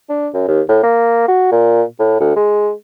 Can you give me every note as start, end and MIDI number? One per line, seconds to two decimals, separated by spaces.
0.09 0.28 62
0.34 0.46 42
0.48 0.61 39
0.69 0.78 45
0.83 1.25 58
1.28 1.47 66
1.52 1.83 46
1.99 2.19 45
2.20 2.31 38
2.36 2.71 56